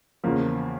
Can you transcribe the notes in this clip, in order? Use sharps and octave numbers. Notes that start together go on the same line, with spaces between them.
E2 C#3 F3 A#3